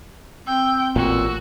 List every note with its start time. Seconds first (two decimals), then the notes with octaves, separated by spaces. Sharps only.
0.47 C4 G5 E6
0.96 A1 A#2 F#4